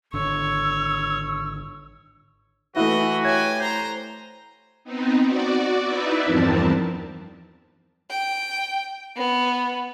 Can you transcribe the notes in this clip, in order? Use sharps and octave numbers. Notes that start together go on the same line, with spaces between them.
G#1 D3 C#5 E6
E3 A3 E4 F#4 D#5
G4 C#5 E5 G#5 G#6
C5 A#5 G6
B3 C4 D#4
F#4 D5
D#4 E4 B4 D5 E5
E2 G2 F3 C4 A#4 A5
G5
B3